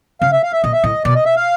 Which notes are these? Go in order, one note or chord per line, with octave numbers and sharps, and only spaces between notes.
C#3 F5
E5
F5
E5
A#2 D#5
E5
A2 D#5
B2 D5
D#5
E5
F5